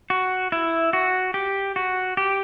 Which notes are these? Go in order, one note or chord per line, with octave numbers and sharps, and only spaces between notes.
F#4
E4
F#4
G4
F#4
G4